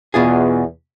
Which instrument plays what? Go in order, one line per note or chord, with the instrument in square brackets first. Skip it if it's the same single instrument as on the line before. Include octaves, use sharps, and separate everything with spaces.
[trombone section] E2 [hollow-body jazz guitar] B2 F4 G#4